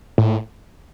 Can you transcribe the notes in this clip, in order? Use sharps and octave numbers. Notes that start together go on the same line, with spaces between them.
A2